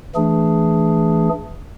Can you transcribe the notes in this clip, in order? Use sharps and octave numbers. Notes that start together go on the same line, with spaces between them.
E3 A3 D4 G#4